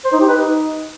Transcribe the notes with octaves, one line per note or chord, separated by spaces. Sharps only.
C5
D#4
G4
B4
D#4